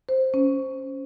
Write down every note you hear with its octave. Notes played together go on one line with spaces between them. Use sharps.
C5
C#4